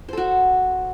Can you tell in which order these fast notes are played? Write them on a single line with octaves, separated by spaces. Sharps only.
C5 A4 F#4